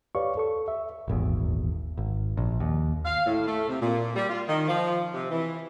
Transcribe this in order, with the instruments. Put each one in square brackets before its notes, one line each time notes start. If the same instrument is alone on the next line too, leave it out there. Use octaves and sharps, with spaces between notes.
[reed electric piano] G4 B4 C#5 D5 F5 C#6
A4 C#6
E5
[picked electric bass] D#1 G#1 E2
G#1
A#1
D#2
[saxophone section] F5
A2
A3
C3
A#2
G3
F4
D#3
F3
C3
E3